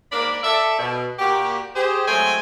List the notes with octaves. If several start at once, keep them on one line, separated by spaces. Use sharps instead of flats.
G#2 A#3 D4 A#4 D5 B5
A4 D5 E5
B2
A#2 A#3 F#4 G4
G4 G#4 C5
F#3 G#3 A3 C4 G5 G#5